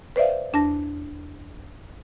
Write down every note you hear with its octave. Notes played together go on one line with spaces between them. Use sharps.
B4 C5 D5 E5 F5
E2 D4 A5 A#6